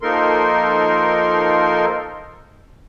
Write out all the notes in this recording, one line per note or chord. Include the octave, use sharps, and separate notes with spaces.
F3 A#3 D#4 A4 A#4 C6